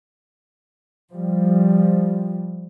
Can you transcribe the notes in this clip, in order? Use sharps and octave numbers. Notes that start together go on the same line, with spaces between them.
F3 G3